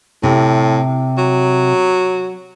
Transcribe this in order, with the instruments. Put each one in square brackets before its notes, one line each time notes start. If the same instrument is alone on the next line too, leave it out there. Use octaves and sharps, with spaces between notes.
[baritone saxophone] A2 [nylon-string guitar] C3
[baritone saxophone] F#3